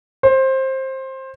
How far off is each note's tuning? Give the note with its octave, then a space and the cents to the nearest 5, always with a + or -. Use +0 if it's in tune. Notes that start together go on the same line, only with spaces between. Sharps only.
C5 +20